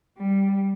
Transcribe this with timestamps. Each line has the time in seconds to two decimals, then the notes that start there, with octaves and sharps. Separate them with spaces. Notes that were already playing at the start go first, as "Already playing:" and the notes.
0.18 G3